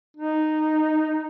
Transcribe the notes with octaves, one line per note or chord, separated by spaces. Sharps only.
D#4